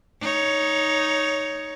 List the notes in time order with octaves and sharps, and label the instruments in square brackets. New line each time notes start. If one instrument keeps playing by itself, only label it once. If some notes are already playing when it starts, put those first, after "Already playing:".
[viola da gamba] D#4 C#5